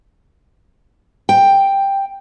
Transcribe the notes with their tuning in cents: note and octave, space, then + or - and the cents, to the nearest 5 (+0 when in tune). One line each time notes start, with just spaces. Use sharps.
G5 +5